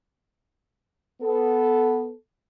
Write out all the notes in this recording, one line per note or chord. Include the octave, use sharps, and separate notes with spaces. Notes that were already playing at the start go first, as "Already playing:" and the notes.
B3 A4